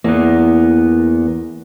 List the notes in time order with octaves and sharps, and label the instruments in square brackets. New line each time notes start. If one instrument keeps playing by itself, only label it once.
[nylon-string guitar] E2 [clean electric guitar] A#3 B3